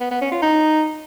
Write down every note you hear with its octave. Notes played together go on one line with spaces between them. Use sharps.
B3
B3
C#4
F4
D#4